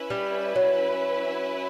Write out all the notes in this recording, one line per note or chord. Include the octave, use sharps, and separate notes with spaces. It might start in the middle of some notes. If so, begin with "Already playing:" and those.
Already playing: C#4 E4 B4
G3
F#3